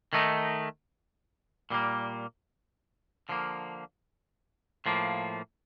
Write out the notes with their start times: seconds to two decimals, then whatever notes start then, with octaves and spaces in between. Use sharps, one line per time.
0.13 D#3 A3 D#4
1.70 A#2 G3 A#3
3.29 D3 F3 A#3
4.86 A2 F3 A#3